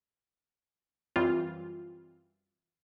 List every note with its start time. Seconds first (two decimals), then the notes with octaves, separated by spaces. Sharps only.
1.16 F#2 E3 G3 C4 F4